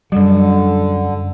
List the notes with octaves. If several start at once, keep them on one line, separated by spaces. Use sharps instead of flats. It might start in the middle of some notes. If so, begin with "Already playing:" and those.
F#2 D3 F#3 G3